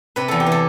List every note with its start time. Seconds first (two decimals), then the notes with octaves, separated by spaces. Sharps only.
0.16 C3 B4
0.28 E2 A4
0.40 G4
0.46 E3
0.52 A4